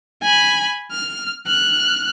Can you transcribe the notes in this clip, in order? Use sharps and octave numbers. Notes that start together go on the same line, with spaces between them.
G#5 B5
F6
F6 F#6